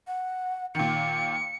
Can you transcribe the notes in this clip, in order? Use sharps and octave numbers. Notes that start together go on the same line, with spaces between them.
F#5
A#2 D#3 G5 C#7